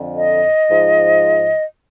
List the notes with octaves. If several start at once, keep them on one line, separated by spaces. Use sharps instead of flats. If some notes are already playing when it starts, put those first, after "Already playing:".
Already playing: F2 D3 F3
D#5
G#2 F3